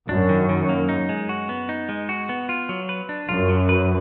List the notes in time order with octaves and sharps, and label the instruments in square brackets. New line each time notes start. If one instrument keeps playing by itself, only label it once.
[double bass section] F#2 [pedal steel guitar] D4
[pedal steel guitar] D#3
D#3
A#3
D#4
G#3
F#4
B3
D#4
G#3
F#4
B3
F4
F#3
B4
D4
[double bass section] F#2 [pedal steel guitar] F4
[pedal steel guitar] F#3
B4